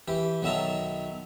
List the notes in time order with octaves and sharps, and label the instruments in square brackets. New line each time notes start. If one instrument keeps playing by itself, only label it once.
[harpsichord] E3 G4
B1 D#3 F#3 E5 A5 A#5